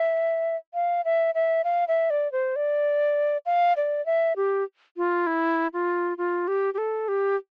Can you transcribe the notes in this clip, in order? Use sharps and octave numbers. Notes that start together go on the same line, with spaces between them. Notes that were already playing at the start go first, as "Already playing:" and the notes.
Already playing: E5
F5
E5
E5
F5
E5
D5
C5
D5
F5
D5
E5
G4
F4
E4
F4
F4
G4
G4
A4
G4